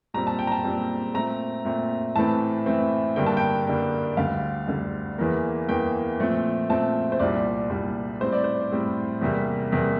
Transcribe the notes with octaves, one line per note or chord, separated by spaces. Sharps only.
A#2 G3 C4 A#5
A5
G5
A#5
A5
A#2 G3 C4
A#2 A3 C4 A#5
A#2 A3 C4
A2 E3 A3 C4 A5
A2 E3 A3 C4
G2 D3 G3 A#3 G5
A5
G5
G2 D3 G3 A#3
D2 D3 G3 F5
D2 D3 G3
E2 E3 A#3
E2 E3 A#3 G5
A#2 F3 A3 C4
A#2 F3 A3 C4 A5
C5
C2 A#2 G3 D5
C2 A#2 G3
A2 G3 C4 C5
D5
C5
A2 G3 C4
E2 C3 G3 A#3
E2 C3 G3 A#3